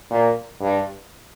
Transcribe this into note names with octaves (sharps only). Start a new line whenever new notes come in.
A#2
G2